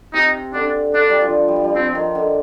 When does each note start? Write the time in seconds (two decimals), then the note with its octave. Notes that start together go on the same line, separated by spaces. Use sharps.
0.14 C3 D#4
0.53 D3 D4
0.94 D3 D4
1.10 G3
1.21 F3
1.48 G3
1.56 F3
1.64 G3
1.75 F3 C4
1.95 D#3
2.15 D3